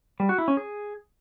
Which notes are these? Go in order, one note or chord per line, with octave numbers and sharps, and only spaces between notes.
G3
F#4
E4
C#4
G#4